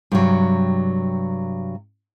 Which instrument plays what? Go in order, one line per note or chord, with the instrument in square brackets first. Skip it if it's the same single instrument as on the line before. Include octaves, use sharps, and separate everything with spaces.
[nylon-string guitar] G2 C3 F#3